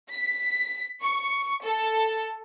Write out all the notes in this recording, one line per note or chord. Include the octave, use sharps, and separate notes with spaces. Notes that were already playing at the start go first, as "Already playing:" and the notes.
B6
C#6
A4